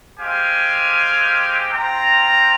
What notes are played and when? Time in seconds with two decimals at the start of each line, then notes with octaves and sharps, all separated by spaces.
0.20 G#3 C4 G4 F5 G#5
1.73 C4 F4 G5 A#5